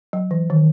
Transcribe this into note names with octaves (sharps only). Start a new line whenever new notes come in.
F#3
E3
D#3